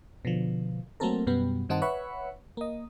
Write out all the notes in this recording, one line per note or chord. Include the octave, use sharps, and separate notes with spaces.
B2 D3 F3
F#3 A3 A#3 C4 A4 A#4
F#2 B2 G3 B3
G2 D#3 C4 D#4 F#5 A5
B4 C#5 E5 F#5 B5 C#6
A#3 D#5